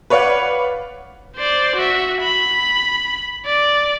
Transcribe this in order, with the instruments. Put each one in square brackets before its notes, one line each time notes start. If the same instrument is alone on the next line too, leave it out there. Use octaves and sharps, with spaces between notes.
[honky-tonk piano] B4 C#5 D5 F5 F#5 F#6
[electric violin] C5 D5
F#4 E5
B5
D5